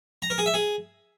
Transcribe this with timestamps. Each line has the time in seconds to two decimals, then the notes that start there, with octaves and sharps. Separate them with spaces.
0.22 A#5
0.30 A#4
0.38 G#4
0.46 E5
0.54 G#4